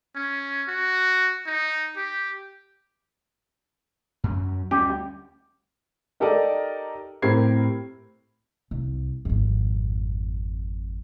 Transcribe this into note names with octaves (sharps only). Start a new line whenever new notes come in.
C#4
F#4
D#4
G4
F#2
D2 G3 C#4 G4
D#4 G4 A4 A#4 D5 D#5
A2 C4 G4 A#4 G#6 C7
C2
G#1 F2